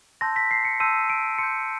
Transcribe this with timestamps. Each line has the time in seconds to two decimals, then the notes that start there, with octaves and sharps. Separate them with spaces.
0.21 A5 C6 E6 G6 A#6
0.36 B6
0.51 C7
0.65 C#7
0.80 A5 C6 E6 G6 D#7
1.10 D7
1.38 C6 E6 G6 C#7